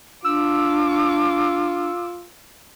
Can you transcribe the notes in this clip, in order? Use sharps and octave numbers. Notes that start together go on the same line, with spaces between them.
D4 F4 D6 E6